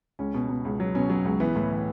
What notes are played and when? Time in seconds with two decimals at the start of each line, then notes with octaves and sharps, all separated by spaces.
0.19 C#2 C#4
0.34 B2
0.49 B2
0.65 C#2
0.80 F#3
0.95 B2 C#4
1.10 F#3
1.25 C#2
1.40 E3 B3
1.56 A2
1.71 E3